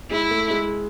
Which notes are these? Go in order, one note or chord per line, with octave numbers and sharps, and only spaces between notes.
G#3 E4
A3
G#3